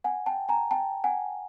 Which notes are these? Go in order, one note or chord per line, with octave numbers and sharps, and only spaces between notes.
F#5 G#5
G5 A5
G#5 A#5
G5 A5
F#5 G#5